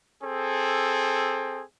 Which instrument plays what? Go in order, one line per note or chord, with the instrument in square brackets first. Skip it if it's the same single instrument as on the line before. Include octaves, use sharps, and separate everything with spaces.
[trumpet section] C4 G#4 A4